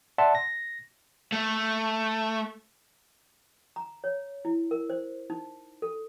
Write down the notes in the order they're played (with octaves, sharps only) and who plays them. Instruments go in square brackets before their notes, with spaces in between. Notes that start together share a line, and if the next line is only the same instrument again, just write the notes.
[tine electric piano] D5 E5 F#5 A5 C6
A#6
[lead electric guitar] A3
[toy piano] A#5
C#5
E4
A#4
C5
D#4
A4